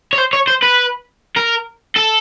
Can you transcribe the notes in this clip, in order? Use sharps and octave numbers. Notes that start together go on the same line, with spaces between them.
C#5
C5
C#5
C5
B4
A#4
A4